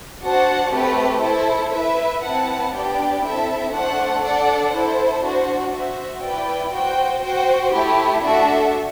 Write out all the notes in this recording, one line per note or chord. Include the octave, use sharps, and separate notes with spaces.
D4 F#4 C5 F#5 A5
A3 C4 G4 B4
E4 A4 C5
E4 B4 E5
C4 E4 B4 F#5 A5
B3 D4 G4 D5 G5
C4 E4 A4 E5
A3 D4 A4 C5 F#5
D4 A4 D5 F#5
E4 A4 C5
D4 F#4 C5
F#4 C5 E5
E4 B4 D5 G5
F#4 C5 G5
F#4 C5 G5
A3 E4 G4
A3 D4 F#4 A4 E5